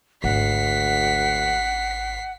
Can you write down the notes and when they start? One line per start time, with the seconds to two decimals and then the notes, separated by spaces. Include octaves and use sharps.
0.24 G#1 D2 F#5 B6 C7